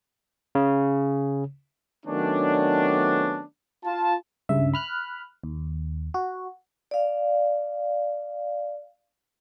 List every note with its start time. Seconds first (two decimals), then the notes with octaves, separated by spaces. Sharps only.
0.55 C#3
2.06 D#3 F#3 A3 B3 C#4 D4
3.85 F4 A5
4.49 C#2 G2 C#3 E5
4.74 B5 F6 F#6
5.44 D#2
6.14 F#4
6.91 D5 F5